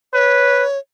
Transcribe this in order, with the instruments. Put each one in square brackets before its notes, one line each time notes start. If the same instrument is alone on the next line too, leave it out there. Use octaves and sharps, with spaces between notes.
[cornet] B4 [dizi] C#5